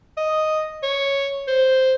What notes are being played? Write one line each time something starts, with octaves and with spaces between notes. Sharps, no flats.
D#5
C#5
C5